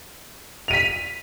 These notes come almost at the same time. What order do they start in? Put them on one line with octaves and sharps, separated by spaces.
F7 D#7 B6